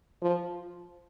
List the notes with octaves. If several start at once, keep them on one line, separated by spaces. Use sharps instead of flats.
F3